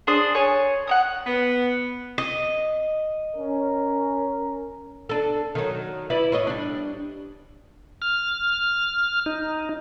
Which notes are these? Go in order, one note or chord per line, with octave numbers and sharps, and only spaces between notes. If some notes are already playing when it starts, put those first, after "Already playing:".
D4 G#4 C5 D#6
C#5 G#5
F#5 A#5 D#6
B3
D#5
C#4 A#4
D4 A4
D#3 F#3
E4 B4 D5
A2 C#5 D#5
G3 D4
F6
D#4